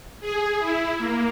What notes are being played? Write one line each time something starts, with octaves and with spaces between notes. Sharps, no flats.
G#4
E4
A#3